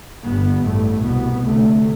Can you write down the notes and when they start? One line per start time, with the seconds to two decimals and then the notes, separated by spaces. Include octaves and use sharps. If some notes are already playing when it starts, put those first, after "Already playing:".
0.24 G1 G2 B3
0.64 A1 G2 A3
1.03 C2 B2 B3
1.43 D2 C3 A3